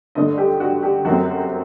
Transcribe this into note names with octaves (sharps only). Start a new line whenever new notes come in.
G2 D3 A3 D#5
G4
F#4
G4
F#2 F#3 A3 C4 F#4